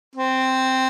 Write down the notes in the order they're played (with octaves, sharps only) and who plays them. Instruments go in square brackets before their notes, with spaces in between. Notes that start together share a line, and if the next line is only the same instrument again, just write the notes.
[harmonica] C4